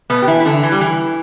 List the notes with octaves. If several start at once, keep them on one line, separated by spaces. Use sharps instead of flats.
B2 B3
G4
E3 E4
E4
D3 D4
E3
G3
E3